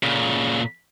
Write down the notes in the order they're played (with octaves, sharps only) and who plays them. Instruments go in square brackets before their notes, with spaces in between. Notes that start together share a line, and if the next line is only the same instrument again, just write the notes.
[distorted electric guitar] A#2 C#3